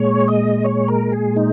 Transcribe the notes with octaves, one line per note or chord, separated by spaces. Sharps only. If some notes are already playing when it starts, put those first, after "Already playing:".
Already playing: A#2 G#3 C#5
D#5
C#5
A#4
G#4
D#4